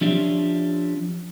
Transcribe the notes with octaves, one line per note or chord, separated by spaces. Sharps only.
F3 C#4 D4 F4 G4 E5